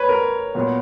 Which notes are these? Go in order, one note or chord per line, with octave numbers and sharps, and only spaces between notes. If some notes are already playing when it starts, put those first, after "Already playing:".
Already playing: B4 C#5
A#4
A#2 F#3 B3